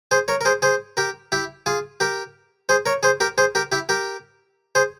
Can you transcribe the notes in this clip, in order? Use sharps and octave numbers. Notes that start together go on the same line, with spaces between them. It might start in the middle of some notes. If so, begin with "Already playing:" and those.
G#4 C5
A#4 C#5
A#4
G#4 C5
G#4 C5
G4 A#4
E4 G4
F4 G#4
G4 A#4
G#4 C5
A#4 C#5
G#4 C5
G4 A#4
G#4 C5
G4 A#4
E4 G4
G4 A#4
G#4 C5